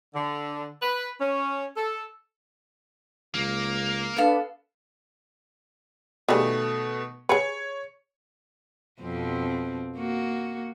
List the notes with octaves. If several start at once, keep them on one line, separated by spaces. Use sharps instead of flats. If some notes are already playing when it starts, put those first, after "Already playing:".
D3
B4
C#4
A4
C#2 A#3
B3 D4 A4 B4 F5
B2 D#3 G3 A3 G#4
G#4 B4 C#5 C#7
F2 B2 C4
A#3 F#4